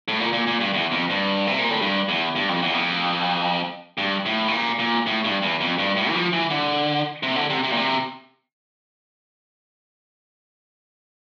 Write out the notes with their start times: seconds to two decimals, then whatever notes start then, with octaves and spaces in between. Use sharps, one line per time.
0.08 A2
0.20 A#2
0.33 A#2
0.47 A#2
0.61 G2
0.74 E2
0.92 F2
1.10 G2
1.47 C3
1.59 A#2
1.70 A2
1.82 G2
2.09 E2
2.35 G2
2.49 F2
2.62 E2
2.74 F2
3.98 G2
4.26 A2
4.48 C3
4.52 A#2
4.79 A#2
5.06 A2
5.24 G2
5.43 E2
5.61 F2
5.79 G2
5.97 A2
6.09 E3
6.15 F3
6.33 E3
6.50 D3
7.23 C3
7.36 D3
7.50 C3
7.63 C3
7.71 A#2
7.77 C3